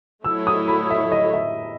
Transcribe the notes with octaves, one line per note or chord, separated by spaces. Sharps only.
F#3 A3 E4 A4 C#5 E6
D#6
B5
E5
D#5
E5